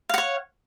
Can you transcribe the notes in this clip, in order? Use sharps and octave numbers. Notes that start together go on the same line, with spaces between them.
C#5 F5 F#5